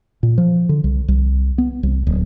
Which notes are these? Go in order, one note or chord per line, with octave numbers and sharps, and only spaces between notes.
A#2
F3
D3
C2
C2
B3
C2
D1